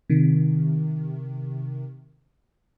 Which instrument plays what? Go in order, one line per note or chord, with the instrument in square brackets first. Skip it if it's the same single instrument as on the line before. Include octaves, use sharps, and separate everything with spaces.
[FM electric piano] C3 D#3